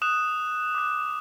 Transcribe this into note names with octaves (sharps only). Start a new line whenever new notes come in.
D#6 F#6 E7
D6 F#6